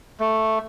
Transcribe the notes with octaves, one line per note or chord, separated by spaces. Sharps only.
A3